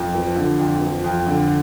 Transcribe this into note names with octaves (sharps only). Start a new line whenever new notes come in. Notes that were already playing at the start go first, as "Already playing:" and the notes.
Already playing: F2
F3
D3
F2
F3
F2
D3